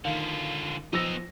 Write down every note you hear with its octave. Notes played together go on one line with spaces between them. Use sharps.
D3 D#3 F4 F5
F3 B3 D#4 E6 A#6